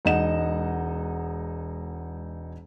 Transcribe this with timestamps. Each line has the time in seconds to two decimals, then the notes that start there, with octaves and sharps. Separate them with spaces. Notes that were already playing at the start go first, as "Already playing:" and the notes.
0.05 E1 G#3 D#4 D#5 F#5 E7